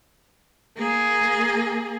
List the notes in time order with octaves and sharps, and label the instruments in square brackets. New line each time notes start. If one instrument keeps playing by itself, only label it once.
[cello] A#3 G#4